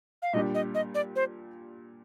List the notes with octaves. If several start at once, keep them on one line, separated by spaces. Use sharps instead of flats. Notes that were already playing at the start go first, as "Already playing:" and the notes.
F5
A#2 G3 D4 G4 D#5
D#5
D#5
D5
C5